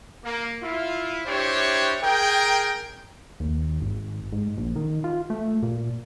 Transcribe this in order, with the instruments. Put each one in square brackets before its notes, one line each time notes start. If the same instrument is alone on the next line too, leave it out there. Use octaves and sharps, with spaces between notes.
[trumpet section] A#3
E4 F4
D4 E4 G4 C5 C#5
G#4 A#4 G5
[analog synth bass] D#2
G#1
G#2
A#1
D#3
F4
A3
A#2